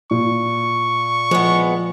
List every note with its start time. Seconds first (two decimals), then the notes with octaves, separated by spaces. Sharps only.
0.11 A#2 C#6
1.31 F3 G#3 B3